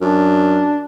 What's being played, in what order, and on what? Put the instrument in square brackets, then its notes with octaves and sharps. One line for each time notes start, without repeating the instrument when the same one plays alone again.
[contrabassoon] F#2 [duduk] D4